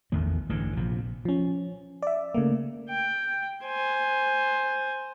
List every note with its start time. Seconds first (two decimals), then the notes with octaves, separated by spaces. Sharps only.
0.12 A1 E2 D#3 A3
0.49 A1 G2 D3 E3
0.76 A#1 C3 F3
1.25 F3 C#4
2.03 D5 E5
2.34 C#3 A3 A#3
2.89 G5
3.65 C5 G#5